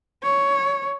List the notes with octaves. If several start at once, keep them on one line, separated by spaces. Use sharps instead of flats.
C#5